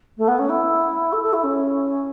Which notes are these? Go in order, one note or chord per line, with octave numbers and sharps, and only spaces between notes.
A3
B3
C#4
E4
A4
A4
E4
C#4